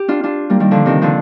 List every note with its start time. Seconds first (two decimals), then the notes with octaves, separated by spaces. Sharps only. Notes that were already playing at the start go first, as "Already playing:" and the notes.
Already playing: G4
0.08 D4 F4
0.23 D4 F4
0.50 G3 A#3
0.60 D#3 G3
0.71 D3 F3
0.86 C3 D#3
1.02 D3 F3